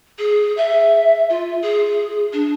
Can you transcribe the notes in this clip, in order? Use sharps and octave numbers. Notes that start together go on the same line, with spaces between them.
G#4
E5
F4
G#4
D4